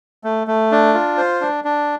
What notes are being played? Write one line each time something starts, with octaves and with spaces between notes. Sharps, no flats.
A3
A3
D4
F4
C5
D4
D4